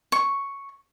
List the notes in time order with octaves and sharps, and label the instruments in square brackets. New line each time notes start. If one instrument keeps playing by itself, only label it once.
[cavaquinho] C#6